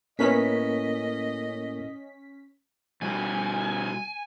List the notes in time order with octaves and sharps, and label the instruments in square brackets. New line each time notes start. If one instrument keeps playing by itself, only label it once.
[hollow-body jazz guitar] A2 B3 [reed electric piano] A#3 A#4 [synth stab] C#4 B6 [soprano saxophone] D#5
[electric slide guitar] B2 G3 F#4 [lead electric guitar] G#5